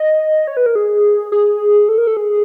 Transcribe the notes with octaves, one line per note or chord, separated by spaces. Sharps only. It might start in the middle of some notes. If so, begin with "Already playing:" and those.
Already playing: D#5
C#5
B4
A#4
G#4
G#4
A4
A#4
A4
G#4